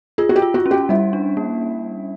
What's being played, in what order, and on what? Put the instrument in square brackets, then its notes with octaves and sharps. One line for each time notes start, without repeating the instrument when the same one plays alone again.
[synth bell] F4 [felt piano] G#4
[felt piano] F#4
G4
[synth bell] F4
[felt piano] F#4
[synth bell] C#4
[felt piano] G4
[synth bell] G3 [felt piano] E4
[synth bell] D4
A#3